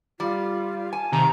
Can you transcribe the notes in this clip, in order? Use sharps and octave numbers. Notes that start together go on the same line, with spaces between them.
G3 F4
G#5 A5
C3 D#3 A#5